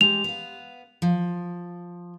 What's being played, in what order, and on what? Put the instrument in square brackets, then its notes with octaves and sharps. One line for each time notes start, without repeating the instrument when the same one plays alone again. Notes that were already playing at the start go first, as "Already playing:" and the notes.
[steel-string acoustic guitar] G#3 G4 [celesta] F7
[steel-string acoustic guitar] B3 F5
F3